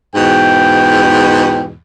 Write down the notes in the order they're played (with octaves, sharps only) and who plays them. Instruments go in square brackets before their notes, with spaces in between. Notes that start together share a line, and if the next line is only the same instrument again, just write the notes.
[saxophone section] E2 G#2 B2 [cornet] G5